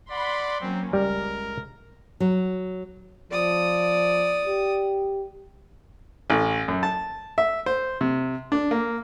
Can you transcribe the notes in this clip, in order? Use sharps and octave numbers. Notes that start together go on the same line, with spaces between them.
D5 F#5 B5 C6
F#3 A#3 C4 C#4
C#2 G3 A#4
F#3
F3 D5 D#6
G4
A1
F#2
A5
E5
C5
C3
D4
A#3